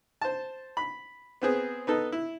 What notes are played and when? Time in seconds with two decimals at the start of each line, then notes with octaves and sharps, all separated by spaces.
0.21 C5 A5
0.77 B5
1.42 B3 C4 G#4
1.87 B3 D#4 A4
2.12 E4